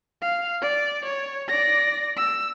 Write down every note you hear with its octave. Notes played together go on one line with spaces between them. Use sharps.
F5
D5
C#5
D5 A#6
E6